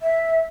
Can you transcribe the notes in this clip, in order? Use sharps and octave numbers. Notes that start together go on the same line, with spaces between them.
E5